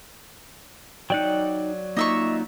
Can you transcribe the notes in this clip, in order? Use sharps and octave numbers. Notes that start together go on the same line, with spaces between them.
F#3 D#4 D5 G5 F#6
A#3 D#4 F4 D#5 E5 C#6